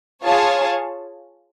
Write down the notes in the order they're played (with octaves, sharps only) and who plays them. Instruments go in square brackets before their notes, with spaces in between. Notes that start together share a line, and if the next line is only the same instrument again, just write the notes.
[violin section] F4 G#4 C#5 F5 A5